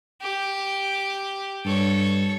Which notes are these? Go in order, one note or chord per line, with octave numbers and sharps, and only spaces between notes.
G4
G2 A4 C#5